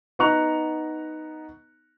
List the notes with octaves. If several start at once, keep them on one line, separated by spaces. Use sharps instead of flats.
B3 D#4 A#5 C#6 F#6 F7